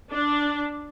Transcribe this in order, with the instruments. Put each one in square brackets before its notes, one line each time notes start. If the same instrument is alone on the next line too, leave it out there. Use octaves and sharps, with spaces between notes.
[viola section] D4